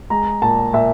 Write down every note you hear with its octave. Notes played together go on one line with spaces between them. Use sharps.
G#3 A#5
A#2 A5
A#2 E5